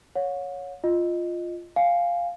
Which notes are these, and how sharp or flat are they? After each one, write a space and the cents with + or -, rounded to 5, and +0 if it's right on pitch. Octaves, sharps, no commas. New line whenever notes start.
C#5 +5 F#5 -45
F4 +0 D#5 -5
F5 +0 G#5 +0